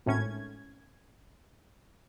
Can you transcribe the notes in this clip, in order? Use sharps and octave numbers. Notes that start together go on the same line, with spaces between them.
G#1 A2 C#4 G#6